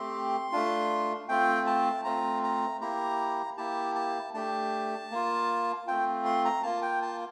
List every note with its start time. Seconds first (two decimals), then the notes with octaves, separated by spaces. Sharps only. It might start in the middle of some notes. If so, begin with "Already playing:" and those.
Already playing: A3 C4 G4 C6
0.52 A3 D4 F4
1.29 A3 C4 F4 G5
1.67 A5
2.04 A3 C4 F4 A#5
2.43 A#5
2.81 A#3 E4 G4 A#5
3.57 A#3 E4 G4 A5
3.95 A5
4.34 A3 D4 G4 A5
5.11 A#3 F4
5.87 A3 C4 F4 G5
6.25 C6
6.45 A#5
6.63 A#3 F4 A5
6.82 G5
7.02 A5